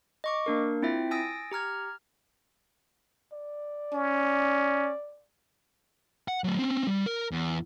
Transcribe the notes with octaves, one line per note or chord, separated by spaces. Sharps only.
D#5 C#6 D6
A#3 D4 A#4
C4 E4 F4 E5 G5
G#5 D#6 E6 A6 A#6 D7
G4 A#5 F6 G#6
D5
C#4
F#5
F#3 A3
C4 C#4
G3
A#4
E2